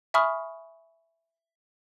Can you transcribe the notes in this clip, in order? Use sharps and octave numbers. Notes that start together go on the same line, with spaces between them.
E5 G#5 B5 C#6 D#6 F6